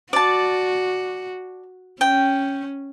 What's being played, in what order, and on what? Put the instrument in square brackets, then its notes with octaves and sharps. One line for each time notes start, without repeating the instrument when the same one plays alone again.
[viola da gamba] F#4 [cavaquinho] D5 A5
[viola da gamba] C#4 [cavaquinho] G5